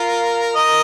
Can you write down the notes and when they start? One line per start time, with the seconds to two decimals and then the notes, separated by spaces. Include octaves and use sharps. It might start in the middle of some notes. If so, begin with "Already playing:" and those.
Already playing: F4 A#4
0.56 A#4 D#5